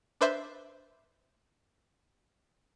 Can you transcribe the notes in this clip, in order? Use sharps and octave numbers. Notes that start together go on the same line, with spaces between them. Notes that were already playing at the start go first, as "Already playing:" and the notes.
D4 B4 C5 E5